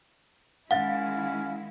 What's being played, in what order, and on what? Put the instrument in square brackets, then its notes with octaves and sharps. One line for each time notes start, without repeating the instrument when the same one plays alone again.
[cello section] D#3 G#3 E4 [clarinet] C#4 [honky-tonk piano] F5 A6 [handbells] F#5